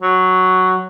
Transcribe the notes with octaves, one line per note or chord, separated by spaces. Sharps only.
F#3